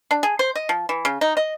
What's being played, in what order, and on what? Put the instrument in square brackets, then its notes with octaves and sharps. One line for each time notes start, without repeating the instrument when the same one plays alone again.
[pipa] D4
G#4
C5
D#5
F3
E3
C#3
D#4
D#5